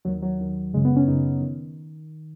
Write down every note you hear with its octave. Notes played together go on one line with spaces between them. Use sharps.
D#2 D#3 F#3
F#3
D#2 D#3
F#2 C#3 G#3
B3
C#4
F#2 C#3 D#4
D#3